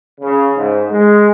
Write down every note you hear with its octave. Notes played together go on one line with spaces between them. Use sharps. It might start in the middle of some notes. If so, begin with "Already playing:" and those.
C#3
G#2
G#3